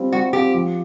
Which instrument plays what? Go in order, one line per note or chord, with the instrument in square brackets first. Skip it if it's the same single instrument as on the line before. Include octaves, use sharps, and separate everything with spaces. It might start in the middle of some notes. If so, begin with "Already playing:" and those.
Already playing: [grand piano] G3 C4 F4
[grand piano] G3 [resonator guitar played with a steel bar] F#4
[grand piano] C4 F4 [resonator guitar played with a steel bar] G4
[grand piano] F3